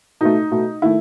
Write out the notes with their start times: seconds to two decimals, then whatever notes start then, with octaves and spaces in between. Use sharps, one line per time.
0.21 B2 A3 D#4
0.51 B2 A3
0.82 D#3 A3 E4